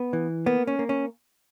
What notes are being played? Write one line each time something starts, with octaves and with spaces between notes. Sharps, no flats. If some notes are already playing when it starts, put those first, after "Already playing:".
Already playing: B3
E3
A#3 B3
C#4
A#3
C#4